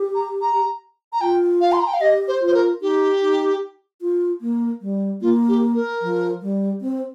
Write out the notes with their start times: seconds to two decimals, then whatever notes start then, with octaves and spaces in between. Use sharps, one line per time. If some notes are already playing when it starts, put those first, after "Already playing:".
Already playing: G4
0.15 A#5
0.42 A#5
1.13 A#5
1.21 F4 G5
1.61 F5
1.72 C6
1.80 A#5
1.87 G5
1.94 F5
2.01 G4 D#5
2.28 C5
2.41 F4
2.47 C5
2.54 A#4
2.81 D#4 G4
3.22 D#4
4.01 F4
4.41 A#3
4.82 G3
5.21 A#3 F4
5.48 G4
5.75 A#4
6.01 F3
6.42 G3
6.81 C4